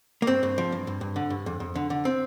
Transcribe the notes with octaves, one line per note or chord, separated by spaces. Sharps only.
A#3
G2 C4
G2
F3
G2
G2
G2
D3
G2
F2
F2
D3
D3
C4